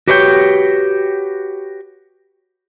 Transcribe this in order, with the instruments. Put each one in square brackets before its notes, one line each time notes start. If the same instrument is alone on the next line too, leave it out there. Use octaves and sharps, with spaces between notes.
[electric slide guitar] F#4 G4 B4 C#5 D5 G5